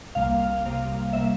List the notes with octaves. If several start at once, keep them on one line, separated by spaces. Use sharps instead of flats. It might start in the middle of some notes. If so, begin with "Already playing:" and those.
C2 C3 G3 A#3 F5
F5
C2 C3 G3 A#3
C3 G3 A#3 E5